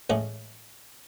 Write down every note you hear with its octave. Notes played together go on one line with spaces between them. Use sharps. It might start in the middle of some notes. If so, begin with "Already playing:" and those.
A1 C#3 G#3 A3